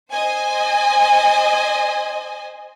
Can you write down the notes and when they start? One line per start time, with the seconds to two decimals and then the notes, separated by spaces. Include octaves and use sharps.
0.11 C5 D#5 G#5